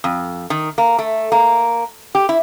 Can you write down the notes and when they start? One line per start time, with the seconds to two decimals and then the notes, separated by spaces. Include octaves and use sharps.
0.04 F2
0.50 D#3
0.78 A#3
0.99 A3
1.32 A#3
2.15 G4
2.29 E4